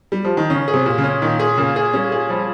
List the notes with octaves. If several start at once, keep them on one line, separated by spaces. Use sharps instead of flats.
G3
F3
D#3
C#3 C#4
G#4
C3
A#2
C#3
C#4
A#2 D#3
G#4
A#2 C#3
G#4
G3 C#4
G#4
F3 G3